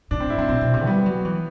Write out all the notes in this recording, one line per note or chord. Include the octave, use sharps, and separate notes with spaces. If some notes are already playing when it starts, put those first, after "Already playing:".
A2 D4
C4
E4
A2 C4
B2 C4
B2
C3
G3 B3
F#3
E3